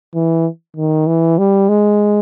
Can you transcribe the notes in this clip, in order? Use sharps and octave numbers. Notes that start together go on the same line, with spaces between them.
E3
D#3
E3
G3
G#3